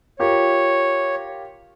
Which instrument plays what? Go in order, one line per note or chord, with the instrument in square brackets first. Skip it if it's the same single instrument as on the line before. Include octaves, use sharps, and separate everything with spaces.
[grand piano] F4 G4 A#4 [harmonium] C#5